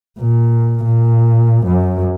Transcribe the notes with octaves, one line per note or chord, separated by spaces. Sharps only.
A#2
A#2
F#2